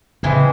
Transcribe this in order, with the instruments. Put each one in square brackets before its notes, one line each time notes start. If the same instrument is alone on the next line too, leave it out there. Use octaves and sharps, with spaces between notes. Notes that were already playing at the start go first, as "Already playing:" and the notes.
[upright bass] C#3 [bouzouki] E3 G#3 C4 E4